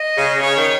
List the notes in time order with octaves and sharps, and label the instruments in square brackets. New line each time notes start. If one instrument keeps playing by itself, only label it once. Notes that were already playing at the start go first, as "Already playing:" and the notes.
Already playing: [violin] D#5
[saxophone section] C#3
[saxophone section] C#3 [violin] C#5
[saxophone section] D#3